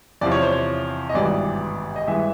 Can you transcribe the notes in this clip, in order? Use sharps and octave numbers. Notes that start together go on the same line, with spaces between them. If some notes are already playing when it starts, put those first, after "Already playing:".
E2 C3 F3 D5
C#5
C5
C#5
D#5
G#1 G2 E3 G3 B3 D5
D#5
G2 E3 G#3 E5